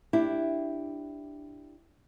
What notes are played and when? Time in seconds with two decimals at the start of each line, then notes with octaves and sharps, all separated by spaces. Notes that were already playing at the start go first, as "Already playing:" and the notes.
0.13 D4 E4 G4